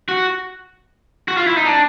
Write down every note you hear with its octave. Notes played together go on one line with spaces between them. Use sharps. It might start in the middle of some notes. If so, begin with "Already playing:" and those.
F#4
F#4
F4
E4
D#4
D4